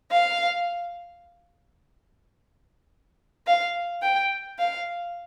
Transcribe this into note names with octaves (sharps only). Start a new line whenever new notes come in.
F5
F5
G5
F5